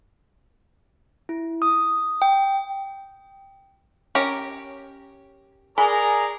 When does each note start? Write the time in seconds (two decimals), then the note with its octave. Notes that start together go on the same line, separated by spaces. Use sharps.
1.29 E4
1.62 D#6
2.22 G5
4.15 C#4 G4 A#4
5.78 G#4 A#4 D5 G#5 A#5 B5